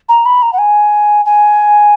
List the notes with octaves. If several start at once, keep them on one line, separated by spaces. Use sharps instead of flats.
A#5
B5
A#5
F#5
G#5
G#5